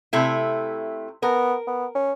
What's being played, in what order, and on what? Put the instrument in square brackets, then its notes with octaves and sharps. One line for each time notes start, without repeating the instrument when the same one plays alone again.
[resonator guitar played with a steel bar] C3 A3 E4
[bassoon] B3 [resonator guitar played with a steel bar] A#4
[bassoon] B3
C#4